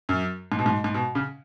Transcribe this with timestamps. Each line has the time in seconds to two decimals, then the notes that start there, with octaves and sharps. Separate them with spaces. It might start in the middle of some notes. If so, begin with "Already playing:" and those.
0.09 F#2
0.52 G#2
0.59 B2
0.66 G#2
0.84 G#2
0.94 B2
1.15 C#3